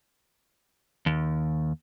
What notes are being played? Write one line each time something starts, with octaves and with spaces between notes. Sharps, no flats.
D#2